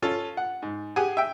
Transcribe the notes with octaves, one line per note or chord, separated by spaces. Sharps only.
C#4 F4 A4
F#5
G#2
G4 G#4 F#5 G#5
E5 G5